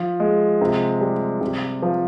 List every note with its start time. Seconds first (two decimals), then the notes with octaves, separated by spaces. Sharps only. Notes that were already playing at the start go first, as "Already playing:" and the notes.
Already playing: F3
0.20 G#3
0.61 C3
1.01 G3
1.41 C3
1.82 F3